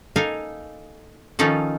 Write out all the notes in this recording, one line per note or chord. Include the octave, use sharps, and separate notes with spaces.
A#3 D#4 A4 F5 G#5
D#3 F3 C#4 D#4 F4 A4